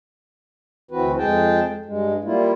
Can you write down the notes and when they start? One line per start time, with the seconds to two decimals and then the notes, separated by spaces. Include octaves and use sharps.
0.91 D2 E3 C4 F#4 B4
1.18 F2 G#3 G#4 G5 A5
1.85 G2 G#3
2.24 G3 A#3 E4 F4